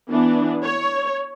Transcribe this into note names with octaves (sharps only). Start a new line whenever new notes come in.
E3 B3 D4
C#5